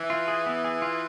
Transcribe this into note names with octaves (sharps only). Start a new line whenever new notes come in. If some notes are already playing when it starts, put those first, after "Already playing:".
Already playing: E3
F4
G#4
B3
G#4
F4